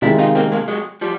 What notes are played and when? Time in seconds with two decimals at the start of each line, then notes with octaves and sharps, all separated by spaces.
0.02 C3 D#3 G#3 D4 E4
0.19 D#4 F4
0.35 A#3 C4
0.52 G#3 A#3
0.68 F#3 G#3
1.01 F3 G3